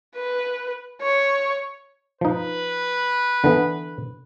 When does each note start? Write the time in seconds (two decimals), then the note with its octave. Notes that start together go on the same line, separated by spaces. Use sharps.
0.16 B4
1.02 C#5
2.21 F3 D#4 B4
3.44 D3 E3 B3